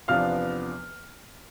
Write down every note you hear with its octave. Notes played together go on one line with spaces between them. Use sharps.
E2 C3 F3 B3 D4 F5 F6